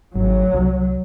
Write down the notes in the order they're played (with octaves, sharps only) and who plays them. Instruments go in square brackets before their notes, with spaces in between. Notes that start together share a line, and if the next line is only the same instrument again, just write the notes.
[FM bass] G#1 [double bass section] F#3
[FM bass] C2